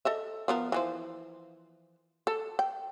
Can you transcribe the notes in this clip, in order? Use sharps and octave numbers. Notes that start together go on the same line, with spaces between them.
A4 D#5 E5
F3 B3 A#4
E3 F3 C5
A4
G5